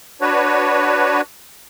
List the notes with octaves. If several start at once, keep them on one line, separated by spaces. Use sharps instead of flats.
D4 F#4 B4 C#5